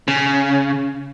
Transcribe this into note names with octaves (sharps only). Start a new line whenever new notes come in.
C#3